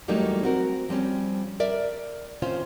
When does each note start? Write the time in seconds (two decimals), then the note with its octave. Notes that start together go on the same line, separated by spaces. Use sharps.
0.08 E2 F#3 G3 A3 A#3 D#4
0.43 C4 F#4 A#4
0.89 F3 G3 C4 C#4
1.60 A#4 D5 E5
2.42 C3 D#3 C#4 F4 C5